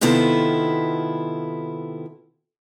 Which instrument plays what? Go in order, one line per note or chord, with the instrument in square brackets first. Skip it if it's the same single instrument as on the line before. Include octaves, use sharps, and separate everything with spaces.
[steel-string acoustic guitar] C3 D#3 B3 E4 F4 A4